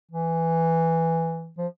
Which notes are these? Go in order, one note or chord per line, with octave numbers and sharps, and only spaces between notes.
E3
F3